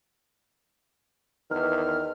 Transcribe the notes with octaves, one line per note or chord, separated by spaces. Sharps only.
E2 D#3 F6